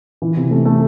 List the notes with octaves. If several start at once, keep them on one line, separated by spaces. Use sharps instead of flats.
E3
C3
A3
A3